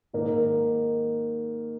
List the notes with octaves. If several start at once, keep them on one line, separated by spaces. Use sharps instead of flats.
G#2 D#3 A#3 D#4 A#4